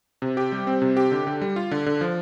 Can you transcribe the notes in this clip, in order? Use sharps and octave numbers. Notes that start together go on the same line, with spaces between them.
C3
G4
G3
C4
C3
G4
D3
D3
G3
F4
D3
D3
F3